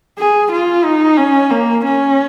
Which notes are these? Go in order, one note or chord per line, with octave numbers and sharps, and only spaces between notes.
G#4
F4
D#4
C#4
A#3
C#4